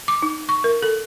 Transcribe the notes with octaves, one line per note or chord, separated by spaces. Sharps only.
D6
D#4
C#6
A#4
A4